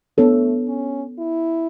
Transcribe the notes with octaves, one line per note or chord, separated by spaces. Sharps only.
A3 B3 D4 A4 C#5
C#4
E4